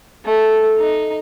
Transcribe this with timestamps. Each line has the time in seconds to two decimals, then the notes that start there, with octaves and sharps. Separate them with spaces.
0.25 A3
0.78 D#4